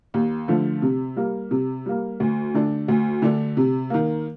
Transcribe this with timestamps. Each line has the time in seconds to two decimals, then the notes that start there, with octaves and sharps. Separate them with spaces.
0.14 D#2
0.48 D3 F3 A3
0.82 C3
1.16 G3 A#3
1.51 C3
1.86 G3 A#3
2.20 D2
2.54 D3 A3 D4
2.88 D2
3.22 D3 A3 D4
3.57 C3
3.90 D#3 A#3